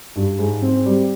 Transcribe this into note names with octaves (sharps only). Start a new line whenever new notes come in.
G2
G#2
C4
G3